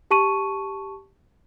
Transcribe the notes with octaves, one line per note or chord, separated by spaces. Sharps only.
G4 A5 C#6 D#7